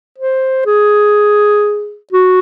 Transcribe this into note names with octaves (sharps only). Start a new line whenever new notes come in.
C5
G#4
F#4